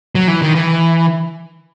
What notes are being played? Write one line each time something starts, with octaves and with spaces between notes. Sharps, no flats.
F#3
E3
D#3
E3